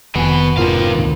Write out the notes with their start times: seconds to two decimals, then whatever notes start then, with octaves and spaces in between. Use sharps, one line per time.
0.15 F1 F2 B2 D#3 B3 G#5
0.58 G#2 C3 F4 A#4 B4 F5
0.94 D2 A#2 D#3